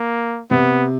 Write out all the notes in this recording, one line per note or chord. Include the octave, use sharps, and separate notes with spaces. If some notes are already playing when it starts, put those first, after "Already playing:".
Already playing: A#3
C3 B3